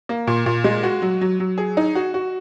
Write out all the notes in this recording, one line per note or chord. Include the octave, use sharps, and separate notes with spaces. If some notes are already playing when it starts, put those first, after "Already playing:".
A#3
A#2
A#2
G#3
F#4
F#3
F#3
F#3
G#4
D#4
F#4
F#4